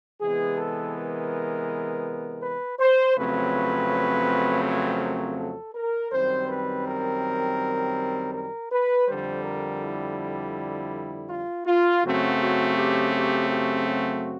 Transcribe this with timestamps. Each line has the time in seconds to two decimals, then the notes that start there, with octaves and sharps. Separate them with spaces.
0.21 C3 E3 G#3 B3 G#4
0.58 A4
0.95 A#4
2.43 B4
2.79 C5
3.17 F2 C#3 F#3 A3 C4 B4
4.65 B4
5.01 A#4
5.38 A4
5.75 A#4
6.12 F#2 D#3 G3 C4 C5
6.49 B4
6.86 A#4
8.34 A#4
8.71 B4
9.08 F2 D3 G3 C5
9.45 A#4
9.82 E4
11.30 F4
11.67 F4
12.03 F#2 C#3 F#3 A3 C4 F#4
12.40 F#4
12.77 G4
13.14 G4
13.50 G4
13.88 F#4